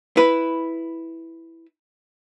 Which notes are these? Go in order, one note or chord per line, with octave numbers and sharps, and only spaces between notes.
E4 B4